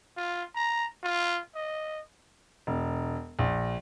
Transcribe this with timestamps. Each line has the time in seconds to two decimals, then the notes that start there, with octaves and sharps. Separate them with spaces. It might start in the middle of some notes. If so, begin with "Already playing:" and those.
0.17 F4
0.55 A#5
1.03 F4
1.55 D#5
2.67 E1
3.39 A#1